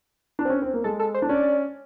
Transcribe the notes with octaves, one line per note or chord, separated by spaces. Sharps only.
D4
C4
C#4
C4
A#3
G#3 A4
A4
C5
D4
C#4 D5